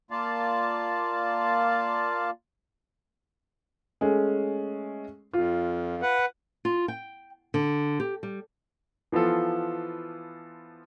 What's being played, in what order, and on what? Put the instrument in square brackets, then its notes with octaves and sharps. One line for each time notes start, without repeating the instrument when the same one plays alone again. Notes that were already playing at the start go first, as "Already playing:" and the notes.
[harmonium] A#3 F4 D5 F5 A5
[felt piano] G#3 A3 C#4
[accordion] F2 [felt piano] F4
[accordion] B4 F#5
[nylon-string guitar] F4
G5
D3
G4
G3
[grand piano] E3 F3 B3 F4 A4